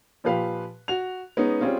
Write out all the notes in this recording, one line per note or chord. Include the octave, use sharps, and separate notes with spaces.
A#2 F3 G4 B4 F5
F#4 F7
G#3 B3 C#4 D#4
G3 C4 C#4 F4 G#4